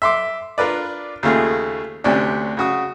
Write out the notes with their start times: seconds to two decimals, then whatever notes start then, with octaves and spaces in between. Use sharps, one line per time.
0.02 E5 C6 D6
0.58 D4 F4 A#4 B4 D5
1.23 D#2 C#3 A3 F4 G#4
2.04 D2 C3 C#4 D4
2.57 C#3 F#4 D#6